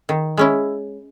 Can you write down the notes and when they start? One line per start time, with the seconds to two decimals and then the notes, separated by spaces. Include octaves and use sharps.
0.09 D#3
0.37 G#3 C#4 E4